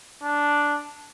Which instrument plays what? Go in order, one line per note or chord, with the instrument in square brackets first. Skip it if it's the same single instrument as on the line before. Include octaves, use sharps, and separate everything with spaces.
[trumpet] D4